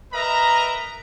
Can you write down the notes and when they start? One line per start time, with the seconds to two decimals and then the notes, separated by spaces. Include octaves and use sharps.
0.13 A#4 B4 D#5 E5 A#5